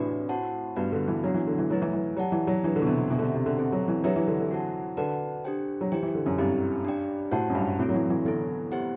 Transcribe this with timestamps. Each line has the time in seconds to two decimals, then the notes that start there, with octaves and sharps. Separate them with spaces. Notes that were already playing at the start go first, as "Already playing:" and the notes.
Already playing: A2 C3 E3 D4 F#4 B4 D5
0.29 F#4 C5 F#5 A5
0.76 G2 B3 F#4 B4
0.92 D3
1.08 E3
1.24 F#3 B3 D4 F#4
1.34 E3
1.47 D3
1.58 E3
1.69 F#3 A3 E4 B4
1.82 E3
1.93 E3
2.16 F#3 G4 D5 F#5 A5
2.32 E3
2.47 F#3
2.64 E3 D4 G4 B4
2.76 D3
2.82 B2
2.87 C3
2.98 C3
3.10 B2 D4 A4 C5 E5 G5
3.18 D3
3.22 C3
3.34 C3
3.46 D3
3.57 C4 E4 A4 C5 F#5
3.72 F#3
3.88 E3
4.04 F#3 D4 G4 B4 E5
4.16 E3
4.27 D3
4.39 D3
4.51 F#4 A4 C5 F#5 A5
4.97 D3 F#4 B4 D5 F#5 A5
5.45 D4 G4 C5 G5
5.81 F#3
5.92 E3 G4 C5 G5
6.03 E3
6.15 D3
6.26 F#2
6.38 G2 C4 E4 G4
6.85 D4 G4 D5 G5
7.31 A2 F#4 C5 F#5 A5
7.50 F#2
7.55 G2
7.79 A2 C4 F#4 A4
7.89 F#3
7.94 E3
8.10 E3
8.25 D3 B3 E4 A4
8.72 B3 E4 G4 C5 F#5